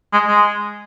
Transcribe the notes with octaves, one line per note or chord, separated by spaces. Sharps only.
G#3
G#3